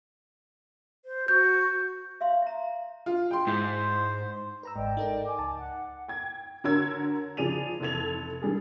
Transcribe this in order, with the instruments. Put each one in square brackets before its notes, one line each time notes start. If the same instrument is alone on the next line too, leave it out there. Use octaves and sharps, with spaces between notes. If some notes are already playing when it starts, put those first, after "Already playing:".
[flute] C5
[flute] F#4 [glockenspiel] G6
[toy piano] E5 F5 C6
E5 A#5
[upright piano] F4
G5 C6
[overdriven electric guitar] G#2 [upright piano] E4 [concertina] C5
[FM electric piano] B4 A#5 E6
[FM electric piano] G#1 G#2 [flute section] D5 D#5 G5
[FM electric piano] D#4 A4 A#4
[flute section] G#5 D6
[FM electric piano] C#2 A5
[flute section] F#5
[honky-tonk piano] G5 G#6
D3 F#4 A#4 C#5 E6 G#6
C#3 F3 G#4 D5 D#7 F7
F1 E3 A4 G#6 F7
D#3 G3 G#4 A4